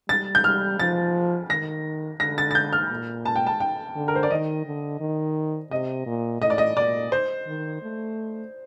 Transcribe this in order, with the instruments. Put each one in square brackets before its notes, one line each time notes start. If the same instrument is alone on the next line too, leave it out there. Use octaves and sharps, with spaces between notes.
[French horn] G3 [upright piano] A6
[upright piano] G6
[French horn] G3 [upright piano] F6
[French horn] F3 [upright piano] A6
[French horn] D#3 [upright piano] A#6
[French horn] D3 [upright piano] A#6
[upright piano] A6
A6
G6
F6
[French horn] A#2
[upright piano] A5
G5
A5
G5
[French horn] D3
[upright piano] A#4
C5
D5
[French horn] D#3 [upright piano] D#5
[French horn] D3
D#3
[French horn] C3 [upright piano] D#5
[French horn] A#2
[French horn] A2 [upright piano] D#5
[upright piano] D5
D#5
[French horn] A#2 [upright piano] D5
[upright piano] C5
[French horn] D#3
A3